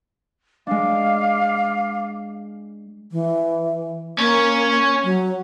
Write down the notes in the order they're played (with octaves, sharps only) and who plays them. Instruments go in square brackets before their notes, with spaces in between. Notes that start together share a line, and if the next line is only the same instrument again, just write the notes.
[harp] G#3 D4 [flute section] F5 D6
[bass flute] E3
[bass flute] A#3 [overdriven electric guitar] C#4 C#5
[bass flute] F#3